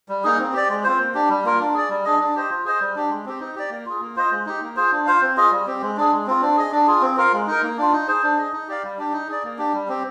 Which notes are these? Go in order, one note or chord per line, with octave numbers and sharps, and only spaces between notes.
G3
A#3 D#4 G#4
C4
G4 D5
G#3
C4 F4 C5
A#3
D4 G4
G3
A#3 F4 A#4
D4
G#4 D5
G3
D4 G#4 D#5
D4
G4 C5 D#5
F4
G#4 C5 D#5
G3
D4 G4
G#3
C4 G4
D#4
G4 D5
A#3
F4 G#4
A#3
F4 C5 D#5
G#3
D#4 G4
A#3
F4 G#4 C5
D4
F4 C5 F5
C4
F4 G#4 D#5
G3
C4 G4
G#3
D4 G#4
G#3
C4 F4
D4
G#4 D#5
D4
F4 G#4
C4
F4 A#4 F5
G#3
D#4 A#4
A#3
D4 F4
D#4
G#4 C5
D4
G#4 D#5
D#4
G4 D5 F5
G3
D4 G4
D#4
G#4 D5
A#3
D4 G4
G3
C4 G4